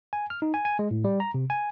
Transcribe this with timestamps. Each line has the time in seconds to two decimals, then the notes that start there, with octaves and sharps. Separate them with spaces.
0.13 G#5
0.30 F6
0.42 D#4
0.54 G#5
0.65 G#5
0.79 G#3
0.91 A2
1.04 G3
1.20 A#5
1.34 C3
1.50 G#5